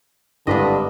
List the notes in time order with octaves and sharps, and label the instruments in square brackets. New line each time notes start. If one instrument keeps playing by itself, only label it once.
[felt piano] G#1 E4 D6 [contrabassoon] G2 [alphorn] D3 [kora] D4 B4 D#5